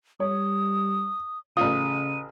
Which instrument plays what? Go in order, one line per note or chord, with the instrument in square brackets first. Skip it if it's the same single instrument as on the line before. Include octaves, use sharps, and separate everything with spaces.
[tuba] G3 [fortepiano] C#5 [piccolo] D#6
[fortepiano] A1 F4 [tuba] C#3 [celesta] D#6 [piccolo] D#7